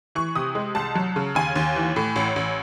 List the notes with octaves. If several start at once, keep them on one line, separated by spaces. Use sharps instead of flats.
E3 C#6
C3 D#6
G#3
C2 A5
F#3
C#3
D#2 G#5
D#2
E3
A2
A1
A1